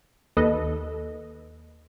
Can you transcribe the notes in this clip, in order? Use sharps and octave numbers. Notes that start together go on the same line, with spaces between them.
D#2 A4 B4 D#5